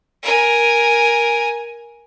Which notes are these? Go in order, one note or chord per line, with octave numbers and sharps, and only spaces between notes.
A#4 G#5